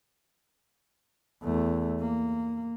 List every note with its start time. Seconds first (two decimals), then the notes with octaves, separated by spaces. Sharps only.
1.43 E2 A3
2.00 A#3